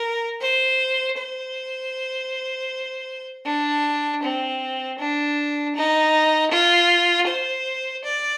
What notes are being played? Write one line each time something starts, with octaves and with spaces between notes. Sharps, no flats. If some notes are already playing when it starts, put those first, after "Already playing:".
Already playing: A#4
C5
C5
D4
C4
D4
D#4
F4
C5
D5